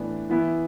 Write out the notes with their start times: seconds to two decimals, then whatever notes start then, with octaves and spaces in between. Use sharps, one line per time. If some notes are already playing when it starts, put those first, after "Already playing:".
Already playing: A2 E3 B3 D4
0.30 E3 B3 E4